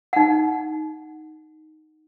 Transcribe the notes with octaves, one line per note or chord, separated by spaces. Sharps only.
D#4 F#5